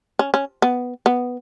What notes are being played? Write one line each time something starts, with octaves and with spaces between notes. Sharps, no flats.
C#4
C#4
B3
B3